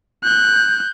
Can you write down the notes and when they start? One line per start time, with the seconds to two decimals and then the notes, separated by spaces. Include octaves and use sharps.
0.24 F#6 G6